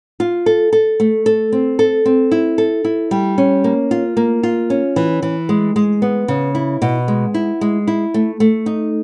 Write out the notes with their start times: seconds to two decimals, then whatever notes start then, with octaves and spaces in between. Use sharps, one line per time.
0.20 F4
0.46 A4
0.73 A4
1.00 A3
1.26 A4
1.52 C4
1.79 A4
2.05 C4
2.31 E4
2.58 A4
2.84 E4
3.11 G3
3.38 C#4
3.64 A#3
3.91 F4
4.17 A#3
4.43 F4
4.70 C#4
4.96 E3
5.22 E3
5.49 G#3
5.76 G#3
6.02 B3
6.28 C#3
6.55 E4
6.82 B2
7.08 G#3
7.34 E4
7.61 G#3
7.87 E4
8.14 A3
8.40 A3
8.66 D#4